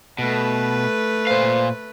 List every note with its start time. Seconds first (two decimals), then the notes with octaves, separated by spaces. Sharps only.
0.19 B2 A3 B4
1.27 A#2 C5 F5